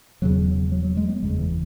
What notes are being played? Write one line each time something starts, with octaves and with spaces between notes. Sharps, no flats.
E1 E2 C#3 F#3
F#3
F#3
G#3
B3
F#1 E2 C#3 G#3
E3